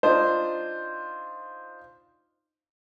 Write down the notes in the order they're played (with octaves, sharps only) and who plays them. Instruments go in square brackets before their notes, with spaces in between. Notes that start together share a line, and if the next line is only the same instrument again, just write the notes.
[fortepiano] D4 D#4 F4 C5